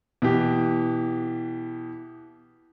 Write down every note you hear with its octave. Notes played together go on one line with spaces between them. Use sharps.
B2 E3 G4